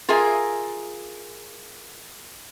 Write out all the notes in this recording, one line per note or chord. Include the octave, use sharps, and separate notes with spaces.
F4 G#4 A#4 E5 G#5